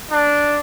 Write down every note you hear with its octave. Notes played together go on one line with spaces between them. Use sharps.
D4